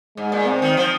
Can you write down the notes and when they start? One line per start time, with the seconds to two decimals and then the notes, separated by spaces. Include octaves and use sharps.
0.17 G#2 G#3
0.32 A#2
0.46 C3 C4
0.62 D#3
0.77 F3